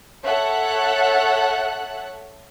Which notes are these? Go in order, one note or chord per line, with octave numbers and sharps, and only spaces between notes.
A4 C#5 E5 F#5 F#6